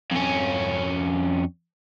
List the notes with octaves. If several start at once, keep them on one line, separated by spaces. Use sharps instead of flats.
F2 C#4